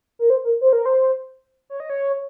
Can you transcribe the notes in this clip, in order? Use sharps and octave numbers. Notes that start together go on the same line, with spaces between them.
A#4
C5
A#4
C5
A#4
C5
C#5
D#5
C#5